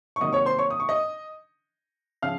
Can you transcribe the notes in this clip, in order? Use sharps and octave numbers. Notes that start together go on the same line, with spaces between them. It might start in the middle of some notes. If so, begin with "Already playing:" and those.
C#6
C3 D#3 F#3 A#3 D#5 D#6
C#5 C#6
C5 C6
C#5 C#6
D#6
C#6
D#5 D#6
C#3 F3 F5 F6